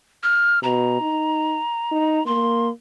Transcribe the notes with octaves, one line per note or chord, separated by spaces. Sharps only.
F6
B2 A#5
D#4
D#4
A#3 C6